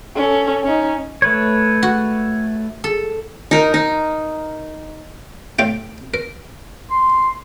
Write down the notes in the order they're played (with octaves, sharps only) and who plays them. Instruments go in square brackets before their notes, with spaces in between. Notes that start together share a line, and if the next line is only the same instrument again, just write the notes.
[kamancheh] C#4 A4
C#4 D#4
[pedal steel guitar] A3 B4 C#5
[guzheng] F#4
A4
[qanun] D#4 A#4
D#4
[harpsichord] A2 F4 G5
A#4
[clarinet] C6